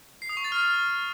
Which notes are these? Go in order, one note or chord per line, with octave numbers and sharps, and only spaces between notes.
C7
D#6
C#6
A6
F6